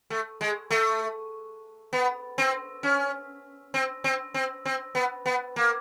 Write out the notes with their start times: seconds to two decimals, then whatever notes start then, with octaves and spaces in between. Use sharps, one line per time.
0.10 A3
0.41 G#3
0.71 A3
1.93 B3
2.38 C4
2.83 C#4
3.74 C4
4.04 C4
4.34 C4
4.65 C4
4.95 B3
5.26 B3
5.56 A#3